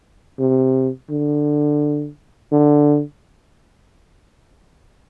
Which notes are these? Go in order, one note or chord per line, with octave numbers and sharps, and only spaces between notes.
C3
D3
D3